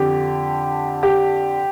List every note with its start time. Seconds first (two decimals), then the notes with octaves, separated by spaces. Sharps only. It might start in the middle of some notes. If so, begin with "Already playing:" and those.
Already playing: F2 D3 G4
1.03 G4